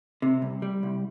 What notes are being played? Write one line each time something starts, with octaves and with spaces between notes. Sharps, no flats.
C3
C2
G3
C2